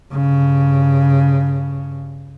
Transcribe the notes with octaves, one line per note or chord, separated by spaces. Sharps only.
G2 C#3